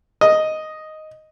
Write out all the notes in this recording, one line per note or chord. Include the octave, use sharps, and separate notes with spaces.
D#5